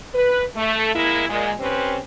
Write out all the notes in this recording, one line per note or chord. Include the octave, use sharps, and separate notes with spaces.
B4
A3
G#3 A#3 E4
A#2 G#3
C4 C#4 G4 B4 C5